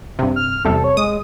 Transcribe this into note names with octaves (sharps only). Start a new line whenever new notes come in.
G2 C3
F6
E2 C3 G3 A4
C#5
G#3 D#6